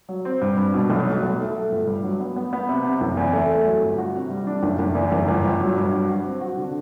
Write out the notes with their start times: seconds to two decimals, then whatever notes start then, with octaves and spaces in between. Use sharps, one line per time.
0.09 F#3
0.25 C4
0.41 G2
0.58 G2
0.74 B2
0.90 B1
1.06 F#3
1.23 B1
1.39 A3
1.55 A3
1.72 G1
1.87 G2
2.04 F#3
2.20 B3
2.36 B3
2.53 B3
2.69 C3
2.84 C3
3.01 F#1
3.17 E2
3.33 A3
3.50 A3
3.66 F#3
3.82 G1
3.98 F#4
4.15 C3
4.30 G3
4.47 D4
4.63 F#1
4.79 F#1
4.95 E2
5.12 F#1
5.28 G1
5.44 G1
5.61 F#3
5.76 G2
5.93 F#3
6.09 F#4
6.25 C4
6.41 F#4
6.57 D3